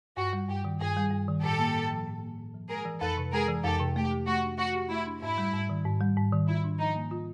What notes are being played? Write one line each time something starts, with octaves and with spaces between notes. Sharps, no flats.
G2 F#4
G3
G2 G4
D#3
G2 G#4
G3
G2
D#3
A2 G4 A4
A#3
A2
F3
A2
A#3
A2
F3
G#3 G#4 A#4
E3
F2 A4 B4
C3
G#3 G#4 A#4
E3
F2 G4 A4
C3
A3 G4
G4
A3 F#4
D4
A3 F#4
G4
A3 E4
D4
G#2 E4
G3
G#2
D#3
G#2
G3
G#2
D#3
E4 F4
D4
F3 D#4
A#3
F4